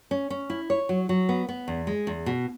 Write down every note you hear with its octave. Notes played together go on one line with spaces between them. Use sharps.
C#4
C#4
E4
C#5
F#3
F#3
B3
B3
E2
G#3
E2
B2